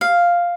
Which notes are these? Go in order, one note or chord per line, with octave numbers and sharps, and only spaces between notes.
F5